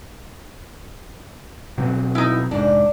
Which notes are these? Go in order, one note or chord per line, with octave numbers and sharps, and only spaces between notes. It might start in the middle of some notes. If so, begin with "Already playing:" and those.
B2 F#3 C4
D#4 E4
F1 G#2 D4